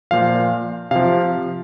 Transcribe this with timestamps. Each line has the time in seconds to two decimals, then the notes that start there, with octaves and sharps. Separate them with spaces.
0.11 A#2 F3 F5
0.91 C3 F3 F5